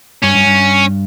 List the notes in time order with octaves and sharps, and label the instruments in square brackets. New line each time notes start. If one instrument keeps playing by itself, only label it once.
[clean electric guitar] G2 [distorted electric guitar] C#4
[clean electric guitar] G2
G2